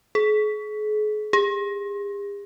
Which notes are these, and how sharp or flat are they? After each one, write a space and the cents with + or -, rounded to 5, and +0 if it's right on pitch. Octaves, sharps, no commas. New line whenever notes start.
G#4 +40
G#4 -45